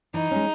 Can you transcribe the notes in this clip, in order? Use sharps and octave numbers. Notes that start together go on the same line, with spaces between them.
E3 D#4
G#3 C#4